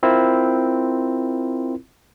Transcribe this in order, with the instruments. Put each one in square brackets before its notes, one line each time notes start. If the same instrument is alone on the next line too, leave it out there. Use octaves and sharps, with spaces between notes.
[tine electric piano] C4 E4 F4 A#4